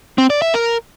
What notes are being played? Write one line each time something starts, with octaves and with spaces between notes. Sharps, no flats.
C4
D5
E5
A#4